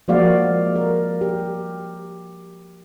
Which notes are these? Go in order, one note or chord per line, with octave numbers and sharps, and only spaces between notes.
F3 G#3 A#3 F#4 D5 F5
A#4
G4